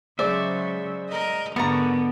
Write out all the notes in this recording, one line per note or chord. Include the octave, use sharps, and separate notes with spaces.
C#3 F#3 G#3 C5 D5 E5
A#4 D#5
G#2 D3 B3 A#4 A#5 C#6 A6 C#7